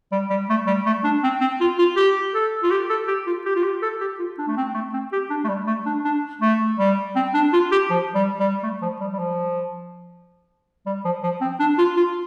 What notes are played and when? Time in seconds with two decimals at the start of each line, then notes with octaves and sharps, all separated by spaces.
0.12 G3
0.30 G3
0.49 A3
0.67 G3
0.86 A3
1.04 D4
1.23 C4
1.41 C4
1.60 F4
1.78 F4
1.96 G4
2.34 A4
2.63 F4
2.71 G4
2.90 A4
3.08 G4
3.26 F4
3.45 G4
3.55 F4
3.64 G4
3.82 A4
4.00 G4
4.19 F4
4.38 D4
4.47 A3
4.57 C4
4.74 A3
4.93 C4
5.12 G4
5.30 D4
5.44 A3
5.48 G3
5.67 A3
5.86 D4
6.04 D4
6.41 A3
6.79 G3
7.15 C4
7.34 D4
7.53 F4
7.72 G4
7.90 F3
8.15 G3
8.40 G3
8.63 A3
8.82 F3
9.01 G3
9.13 G3
9.19 F3
10.86 G3
11.05 F3
11.23 F3
11.41 C4
11.59 D4
11.78 F4
11.97 F4